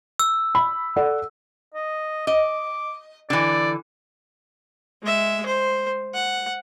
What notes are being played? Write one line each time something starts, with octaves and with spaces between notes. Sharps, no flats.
E6
B5
A4 D5 F#5
D#5
D#5 D6
D3 E3 D5
G#3 E5
C5
F#5